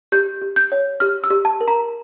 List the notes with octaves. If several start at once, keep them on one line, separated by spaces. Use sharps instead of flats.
G4 G6
G4
G6
C#5
G4 F6
E6
G4
A5
A#4
A#5